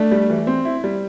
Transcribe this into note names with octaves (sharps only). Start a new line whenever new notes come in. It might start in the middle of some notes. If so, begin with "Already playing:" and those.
Already playing: A3 D4
G3
E3
C4
E4
G3